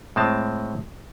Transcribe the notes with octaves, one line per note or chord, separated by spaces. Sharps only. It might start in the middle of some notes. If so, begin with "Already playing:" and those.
A2 G#3 C4 A5